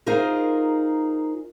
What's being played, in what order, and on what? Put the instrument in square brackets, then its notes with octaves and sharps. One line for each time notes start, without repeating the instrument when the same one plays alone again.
[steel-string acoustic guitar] D#4 F4 G#4 A#4 C5